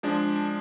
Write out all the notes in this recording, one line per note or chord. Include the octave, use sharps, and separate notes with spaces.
F3 G#3 D4